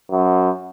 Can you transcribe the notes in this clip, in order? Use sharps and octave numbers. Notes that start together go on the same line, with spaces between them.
F#2